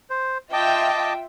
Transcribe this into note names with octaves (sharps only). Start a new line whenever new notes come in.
C5
F4 D#5 E5 G5 A5 D6